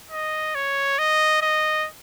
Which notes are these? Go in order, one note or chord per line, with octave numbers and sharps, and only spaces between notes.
D#5
C#5
D#5
D#5